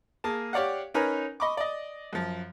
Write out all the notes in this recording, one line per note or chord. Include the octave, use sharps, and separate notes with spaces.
A#3 G#4 A5
G4 C#5 D5 F5 F#5
C#4 D#4 A#4 B4 G#5 A#5
D#5 B5 C#6 D6
D5 D#5
F#2 F3